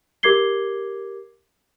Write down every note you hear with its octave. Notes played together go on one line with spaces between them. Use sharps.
G4 A#4 D6 G#6 C7 G7